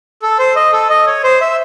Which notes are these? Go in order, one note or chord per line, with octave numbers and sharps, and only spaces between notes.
A4
C5
D#5
A4
D#5
C#5
C5
E5